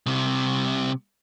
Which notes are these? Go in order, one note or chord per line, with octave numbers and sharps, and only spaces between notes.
C2 C3